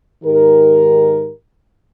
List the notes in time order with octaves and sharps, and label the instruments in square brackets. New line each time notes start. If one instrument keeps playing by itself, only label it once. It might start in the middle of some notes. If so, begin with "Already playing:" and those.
[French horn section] G#2 D#3 G4 A#4